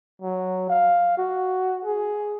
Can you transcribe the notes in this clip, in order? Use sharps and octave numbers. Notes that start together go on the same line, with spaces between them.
F#3
F5
F#4
G#4